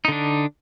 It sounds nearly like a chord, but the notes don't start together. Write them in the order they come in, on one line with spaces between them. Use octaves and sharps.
D#4 D3 D4